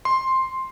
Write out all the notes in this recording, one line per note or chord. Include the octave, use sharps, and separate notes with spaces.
C6